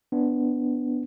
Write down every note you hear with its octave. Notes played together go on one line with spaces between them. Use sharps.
B3 D4